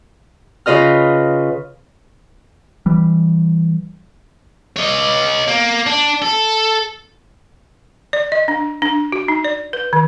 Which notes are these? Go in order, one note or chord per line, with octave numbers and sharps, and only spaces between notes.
C#3 F4 B4 D#5 F6
E3 G3
C#5 D#5
A#3
D4
A4
D5
D#5
D4
D4
F#4
D#4
D5
B4
D#3